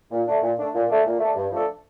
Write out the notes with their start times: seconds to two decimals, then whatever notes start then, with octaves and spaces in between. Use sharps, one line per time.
0.10 A#2
0.26 A3 D4
0.42 A#2
0.57 A3 D4
0.73 A#2
0.88 A3 D4
1.04 A#2
1.19 A3 D4
1.35 G2
1.50 F3 A3 D4 A4